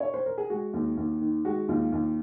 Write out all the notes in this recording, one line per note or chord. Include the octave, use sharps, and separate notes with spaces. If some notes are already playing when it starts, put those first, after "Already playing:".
C#5
C5
A#4
G#4
G#3 F#4
D#2
D#2
D#3
G#3 F#4
D#2 F4
D#2